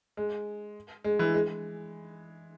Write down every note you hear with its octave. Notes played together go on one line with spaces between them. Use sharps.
G#3
G#3
E3
G#3